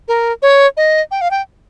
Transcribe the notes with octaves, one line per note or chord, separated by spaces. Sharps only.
A#4
C#5
D#5
G5
F5
G5